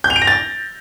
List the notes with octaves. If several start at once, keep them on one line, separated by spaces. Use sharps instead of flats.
G6
F7
D7
A#6
A6